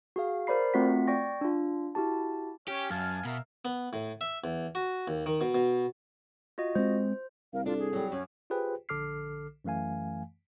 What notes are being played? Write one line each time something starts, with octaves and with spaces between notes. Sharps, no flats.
F#4 G#4 F5
A#4 C5 D5 B5 C7
A3 C4 F4 F#4 F#5 B6
D5 G5 C#6 A#6
D4 F4
E4 F#4 G4 A5
C#4 G4
F#2 F5 G#5 A5
B2 A#4 E5 F5
B3
A2
E5
E2
F#4
D#2
D#3
B2
B2
F4 F#4 D#5
G#3 C4 C5
C2 A#4 F5
D4 F4 A4
G#4
F#3 G3
F#2 C#4
F4 G4 G#4 B4 C5 G5
A#1 D3 A4 D6 F6 C7
F#2 E3 A3 F5 G#5